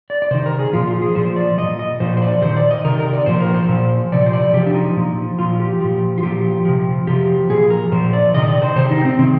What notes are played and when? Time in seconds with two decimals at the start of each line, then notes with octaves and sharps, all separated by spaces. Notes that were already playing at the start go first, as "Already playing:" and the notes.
0.10 D5
0.22 D5
0.31 C3 D#3 C5
0.46 A#4
0.59 G#4
0.73 A#2 F3 F4
0.87 F4
1.02 G#4
1.15 A#2 F3 C5
1.36 D5
1.58 A#2 F3 D#5
1.79 D#5
2.00 A#2 F3 C5
2.17 C5
2.22 D5
2.42 C3 D#3 C5
2.57 D5
2.71 D#5
2.85 C3 D#3 A#4
2.99 A#4
3.13 D5
3.26 A#2 F3 C5
3.40 A#4
3.54 C5
3.69 A#2 F3
4.12 C3 F3 D5
4.26 C5
4.33 D5
4.53 C3 F3 G4
4.67 D4
4.75 D#4
4.96 A#2 F3
5.39 A#2 F3 F4
5.60 G4
5.81 A#2 F3
6.18 F4
6.23 A#2 F3 G4
6.65 C3 F3
7.07 C3 F3 G4
7.50 A#2 F3 G#4
7.70 A#4
7.92 A#2 F3 C5
8.13 D5
8.34 C3 D#3 D#5
8.48 D5
8.62 C5
8.76 C3 D#3 C5
8.91 D#4
9.05 C4
9.19 C3 D#3 C4